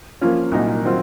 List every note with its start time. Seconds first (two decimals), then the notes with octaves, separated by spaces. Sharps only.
0.21 F3 A#3 C#4 F4
0.52 C2 A#2 F#3 A#3 D#4
0.83 D#3 F#3 C4 F4